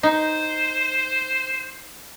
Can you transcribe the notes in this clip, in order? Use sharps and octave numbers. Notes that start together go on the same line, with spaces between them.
D#4 C5